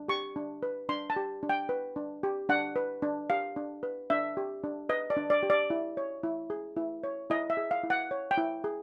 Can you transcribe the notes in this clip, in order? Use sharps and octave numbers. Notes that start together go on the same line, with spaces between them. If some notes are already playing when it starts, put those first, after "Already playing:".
Already playing: D4
G4 C#6
D4
B4
D4 C6
A5
G4
D4
G5
B4
D4
G4
D4 F#5
B4
D4
G4 F5
D4
B4
D4 E5
G4
D4
B4 D#5
D5
D4
D5
G4
D5
E4
C#5
E4
G#4
E4
C#5
E4 D#5
E5
G#4
F5
E4
F#5
C#5
G5
E4
G#4